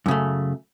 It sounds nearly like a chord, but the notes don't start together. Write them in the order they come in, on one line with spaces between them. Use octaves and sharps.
F#2 C#3 A3